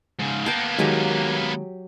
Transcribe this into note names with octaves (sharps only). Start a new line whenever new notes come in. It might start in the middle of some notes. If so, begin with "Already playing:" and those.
G#2 C#3
A#3 B3 G5 A5
D#3 F#3 G#3 G4 G#5